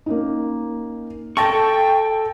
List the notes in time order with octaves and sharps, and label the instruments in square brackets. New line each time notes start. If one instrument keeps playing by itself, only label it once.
[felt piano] A#3 C#4 D#4
[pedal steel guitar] A4 C#6 [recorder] G5 [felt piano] A5 A6 A#6